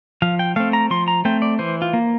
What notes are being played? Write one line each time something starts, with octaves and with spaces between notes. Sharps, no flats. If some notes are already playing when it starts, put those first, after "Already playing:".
F3 F5
G5
A3 C4 F5
A#5
F3 C6
A#5
A3 C4 G5
D5
E3 C5
F4
A#3